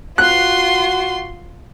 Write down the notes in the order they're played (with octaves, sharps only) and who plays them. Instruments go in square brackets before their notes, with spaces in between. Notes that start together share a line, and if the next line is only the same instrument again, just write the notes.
[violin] F4 C6 [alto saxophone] F#4 [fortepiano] F#6